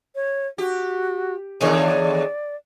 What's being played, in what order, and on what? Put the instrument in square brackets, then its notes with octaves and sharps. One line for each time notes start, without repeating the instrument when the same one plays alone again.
[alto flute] C#5
[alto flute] F#4 [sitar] G4
[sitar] D#2 D3 [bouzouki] D#4 G#4 C#5 [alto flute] A#4
[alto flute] D5